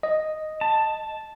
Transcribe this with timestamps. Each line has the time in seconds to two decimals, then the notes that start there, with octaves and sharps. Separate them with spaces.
0.03 D#5
0.61 A5